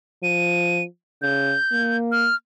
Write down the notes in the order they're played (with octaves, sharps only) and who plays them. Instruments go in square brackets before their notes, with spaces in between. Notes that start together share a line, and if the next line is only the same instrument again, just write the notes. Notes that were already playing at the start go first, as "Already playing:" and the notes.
[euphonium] F3 [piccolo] D#7
[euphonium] C#3 [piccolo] G6
[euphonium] A#3
[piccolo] F6